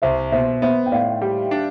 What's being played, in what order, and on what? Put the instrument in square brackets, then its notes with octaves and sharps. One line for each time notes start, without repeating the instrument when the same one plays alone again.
[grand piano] C2 [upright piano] C5 E5
[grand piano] B2 [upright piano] C5 E5
[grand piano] B3 [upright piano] C5 E5
[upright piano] G5
[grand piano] A2 [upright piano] D5 F5
[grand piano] G3
D4